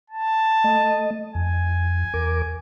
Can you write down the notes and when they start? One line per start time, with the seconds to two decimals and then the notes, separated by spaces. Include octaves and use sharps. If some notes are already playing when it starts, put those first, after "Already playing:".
0.10 A5
0.64 A3 D#5
1.35 F2 G#5
2.14 E2 A#4 D6